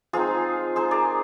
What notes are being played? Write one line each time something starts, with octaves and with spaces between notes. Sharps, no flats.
F3 G#3 C4 D#4 F4 G#4
G#3 D#4 G#4 C5
A#4 D5